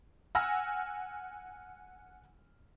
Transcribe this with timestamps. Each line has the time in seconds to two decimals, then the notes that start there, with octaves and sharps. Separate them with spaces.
0.35 F#5 G#5 E6 F6 A#6